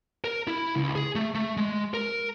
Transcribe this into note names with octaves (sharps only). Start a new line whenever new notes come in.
A#4
E4
C#2
G#4
A3
A3
G#3
A#4